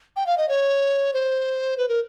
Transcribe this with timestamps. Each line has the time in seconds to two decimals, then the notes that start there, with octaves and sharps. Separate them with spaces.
0.16 G5
0.27 F5
0.38 D#5
0.49 C#5
1.13 C5
1.78 B4
1.89 A#4